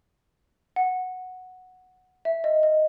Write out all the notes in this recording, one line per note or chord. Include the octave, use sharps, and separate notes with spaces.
F#5
E5
D#5
D#5